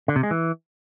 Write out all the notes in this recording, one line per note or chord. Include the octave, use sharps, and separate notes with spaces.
D3
C3
G#3
E3